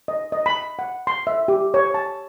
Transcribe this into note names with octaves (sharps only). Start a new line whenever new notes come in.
D#5
D#5
B5
F#5
C6
E5
G4
C#5
A5